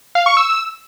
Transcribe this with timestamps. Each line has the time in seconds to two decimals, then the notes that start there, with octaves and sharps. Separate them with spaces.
0.15 F5
0.26 C#6
0.37 E6